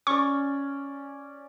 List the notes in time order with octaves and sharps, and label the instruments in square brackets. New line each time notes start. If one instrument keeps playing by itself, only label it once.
[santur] C#4 D5 [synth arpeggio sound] C#6